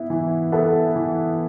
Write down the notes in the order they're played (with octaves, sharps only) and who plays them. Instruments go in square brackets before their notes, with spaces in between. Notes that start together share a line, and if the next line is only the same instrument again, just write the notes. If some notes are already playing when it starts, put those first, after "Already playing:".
Already playing: [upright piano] B3 E4
E3
B3 E4 A4
E3